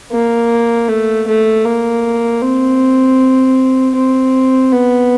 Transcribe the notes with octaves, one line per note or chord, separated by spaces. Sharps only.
A#3
A3
A3
A#3
C4
C4
B3